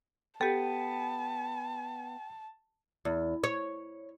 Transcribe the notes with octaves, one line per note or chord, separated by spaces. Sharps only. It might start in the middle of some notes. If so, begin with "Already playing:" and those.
B3 G4 A4 G5 A5
E2
C#5